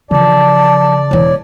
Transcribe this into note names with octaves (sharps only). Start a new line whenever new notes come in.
C#3 E3 F3 D5 A5
E1 E3 C#5